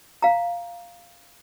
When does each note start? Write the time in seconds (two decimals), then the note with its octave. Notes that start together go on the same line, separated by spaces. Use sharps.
0.22 F5 A#5